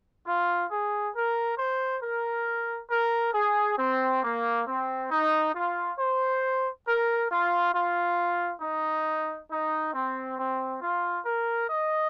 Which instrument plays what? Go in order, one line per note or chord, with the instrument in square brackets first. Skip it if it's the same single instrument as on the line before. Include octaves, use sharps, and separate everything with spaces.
[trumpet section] F4
G#4
A#4
C5
A#4
A#4
G#4
C4
A#3
C4
D#4
F4
C5
A#4
F4
F4
D#4
D#4
C4
C4
F4
A#4
D#5